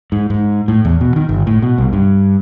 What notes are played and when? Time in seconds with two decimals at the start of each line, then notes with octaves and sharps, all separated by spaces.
0.12 G#2
0.30 G#2
0.68 A2
0.85 E2
1.01 B2
1.16 D#3
1.29 G1
1.47 A2
1.62 B2
1.78 C2
1.93 G2